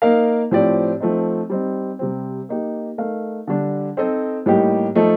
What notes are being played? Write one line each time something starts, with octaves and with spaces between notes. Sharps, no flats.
A#3 D#4 A#4 F5
A2 F3 C4 G4 D5
F3 A3 C4 D#4
G3 C4 D#4
C3 G3 C4
A#3 D#4 G4
A3 D#4 A#4 F5
D3 G3 D4
C4 D#4 A4 C5 D#5
A2 G3 A#3 D#4 G4
F3 A3 D#4 A4